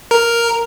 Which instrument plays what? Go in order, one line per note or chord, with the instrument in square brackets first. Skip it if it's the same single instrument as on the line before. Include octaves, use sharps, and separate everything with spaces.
[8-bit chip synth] A#4